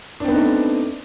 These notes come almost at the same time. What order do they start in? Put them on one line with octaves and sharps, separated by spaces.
D4 C4 B3 D#4 A3